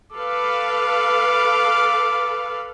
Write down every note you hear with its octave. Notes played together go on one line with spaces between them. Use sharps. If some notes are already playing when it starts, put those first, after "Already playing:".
A4 B4 F5 D6